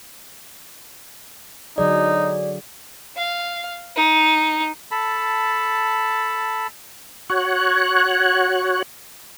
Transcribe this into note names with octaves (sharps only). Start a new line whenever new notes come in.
D3 F#3 D#4 G#4 D5
F5
D#4
A4 A5 B5
F#4 C#5 F#6